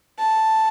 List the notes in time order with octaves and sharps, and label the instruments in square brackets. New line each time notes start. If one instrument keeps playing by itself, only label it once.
[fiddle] A5